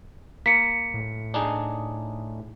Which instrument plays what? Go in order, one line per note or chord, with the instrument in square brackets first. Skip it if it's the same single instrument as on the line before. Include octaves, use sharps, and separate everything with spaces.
[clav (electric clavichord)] A#3 [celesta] B6 C#7
[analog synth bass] A2
[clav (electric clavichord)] D4 D#4 G#4